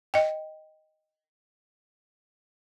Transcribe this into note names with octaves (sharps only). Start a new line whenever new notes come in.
D#5 G5